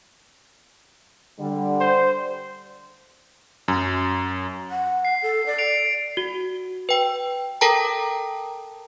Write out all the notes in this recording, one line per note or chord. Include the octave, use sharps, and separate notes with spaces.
D3 G3
C5
F#2
F#5
C7
A4
D5
C7 D7 F7
F#4
B4 G5
A4 A#4 G5 A5 A#5